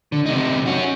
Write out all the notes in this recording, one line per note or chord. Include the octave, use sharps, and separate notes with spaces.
D3
C3 D#4
C#4 F#4